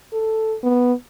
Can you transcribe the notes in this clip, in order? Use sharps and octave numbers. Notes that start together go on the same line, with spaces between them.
A4
B3